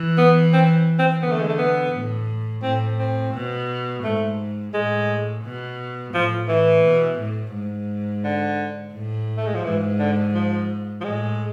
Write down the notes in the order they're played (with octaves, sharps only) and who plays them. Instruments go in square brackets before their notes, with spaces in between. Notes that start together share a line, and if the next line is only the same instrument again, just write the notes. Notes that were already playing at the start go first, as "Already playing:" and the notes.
Already playing: [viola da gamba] E3
[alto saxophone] B3
C4
C4
[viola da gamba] D3 [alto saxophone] B3
[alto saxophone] A3
G#3
A3
B3
[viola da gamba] A2
[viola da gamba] A2 [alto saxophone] C4
[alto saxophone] C4
[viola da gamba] B2
[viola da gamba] G#2 [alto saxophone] A3
[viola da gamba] A2 [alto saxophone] G#3
[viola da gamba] B2
[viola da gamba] A2 [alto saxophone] F3
[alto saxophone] E3
[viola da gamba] B2
A2
G#2
[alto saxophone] D3
[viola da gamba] A2
[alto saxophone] A3
G#3
F3
[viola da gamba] G#2 [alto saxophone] E3
[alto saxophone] D3
F3
F3
[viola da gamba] A2 [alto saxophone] G#3